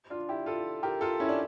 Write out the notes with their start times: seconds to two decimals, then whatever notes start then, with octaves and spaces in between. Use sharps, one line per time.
0.10 D4 F4
0.29 E4 G4
0.46 F4 A4
0.83 G4 A#4
1.01 F4 A4
1.20 C#4 E4
1.29 D4